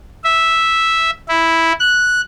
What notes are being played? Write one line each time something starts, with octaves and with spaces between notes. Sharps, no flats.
E5
E4
F#6